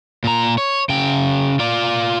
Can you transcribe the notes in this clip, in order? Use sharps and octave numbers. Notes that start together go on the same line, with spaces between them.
A#2 A#5
C#5
C#3 G5
F4 D5